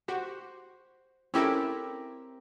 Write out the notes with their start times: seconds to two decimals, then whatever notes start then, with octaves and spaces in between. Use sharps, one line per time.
0.08 F#4 G4 C5
1.34 C4 C#4 E4 G4 A4 A#4